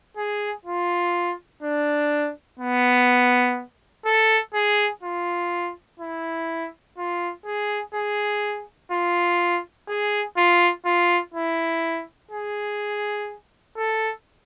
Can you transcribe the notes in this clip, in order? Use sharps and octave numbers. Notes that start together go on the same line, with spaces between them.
G#4
F4
D4
B3
A4
G#4
F4
E4
F4
G#4
G#4
F4
G#4
F4
F4
E4
G#4
A4